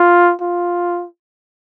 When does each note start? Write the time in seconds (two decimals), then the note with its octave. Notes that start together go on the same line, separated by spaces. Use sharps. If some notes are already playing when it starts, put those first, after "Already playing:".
Already playing: F4
0.41 F4